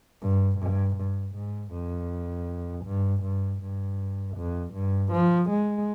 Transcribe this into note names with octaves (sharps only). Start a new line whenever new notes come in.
G2
G2
G2
G#2
F2
G2
G2
G2
F2
G2
F3
G#3